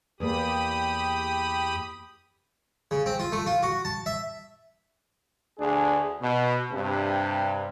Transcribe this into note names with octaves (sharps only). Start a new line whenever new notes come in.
E2 A#3 G4 B5 D#6
C#3
C4
F4
A3
F4
F#4
A5
E5
D2 D4 G#4
B2
G2 C3